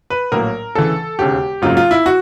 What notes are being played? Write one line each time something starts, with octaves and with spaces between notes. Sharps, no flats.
B4
A#1 A2 F#3 A#3 A#4
D2 C#3 E3 A4
E1 D#2 C#3 G4
G#1 F#2 C#3 F#3 A#3 F4
F4
E4
F#4